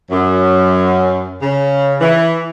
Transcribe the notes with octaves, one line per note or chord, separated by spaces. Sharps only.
F#2
C#3
E3